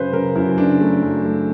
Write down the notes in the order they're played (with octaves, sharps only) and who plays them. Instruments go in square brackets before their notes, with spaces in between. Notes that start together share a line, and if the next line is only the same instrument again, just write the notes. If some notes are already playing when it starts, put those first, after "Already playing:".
Already playing: [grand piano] F#2 C#3 B4 C5
C#3 A#4
F#2 E4
C#3 D4
A3
F#2
A3